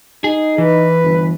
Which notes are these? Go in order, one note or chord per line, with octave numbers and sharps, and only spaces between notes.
D#4 G#4
E3 B4
G1